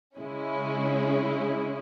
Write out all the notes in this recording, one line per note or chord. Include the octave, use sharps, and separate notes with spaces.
C#3 G#3 C#4 E4